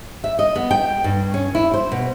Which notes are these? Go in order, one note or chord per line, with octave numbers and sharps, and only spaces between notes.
E5
D#5
B3
G5
G2
C#4
E4
C5
B2